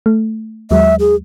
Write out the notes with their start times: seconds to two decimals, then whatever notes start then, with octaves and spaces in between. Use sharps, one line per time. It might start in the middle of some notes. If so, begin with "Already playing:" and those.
0.06 A3
0.71 D#2 F#3 G#3 E5
1.00 G#4